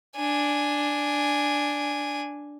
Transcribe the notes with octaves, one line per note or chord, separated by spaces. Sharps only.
D4 G#5